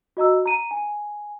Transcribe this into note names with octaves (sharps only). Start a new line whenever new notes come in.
F#4 D#5 A#5 E6
A#5 D#7
G#5